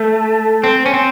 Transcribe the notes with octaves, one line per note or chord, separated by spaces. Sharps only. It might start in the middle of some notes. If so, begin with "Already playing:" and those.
Already playing: A3
C4
C#4
C4